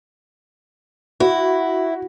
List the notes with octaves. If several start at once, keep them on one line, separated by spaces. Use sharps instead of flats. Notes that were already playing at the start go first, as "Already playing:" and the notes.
E4 F#4